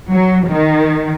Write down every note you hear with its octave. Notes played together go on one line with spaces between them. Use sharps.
F#3
D#3